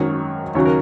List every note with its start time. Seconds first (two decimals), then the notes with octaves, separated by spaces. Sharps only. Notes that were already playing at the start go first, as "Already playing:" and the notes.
Already playing: G#1 F#2 D#3 F#3 C#5
0.55 D#2 C#3 F#3 C#5
0.65 A#4